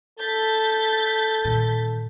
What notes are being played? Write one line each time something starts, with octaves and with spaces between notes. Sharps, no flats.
A4 G6 A6 B6
A#2 D#3